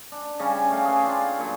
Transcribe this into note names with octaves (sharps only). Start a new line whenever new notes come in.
D4
C#3 G3 C#4
A3 F5
G#4 B4 D6
C4 D4 F4
A#2 F#3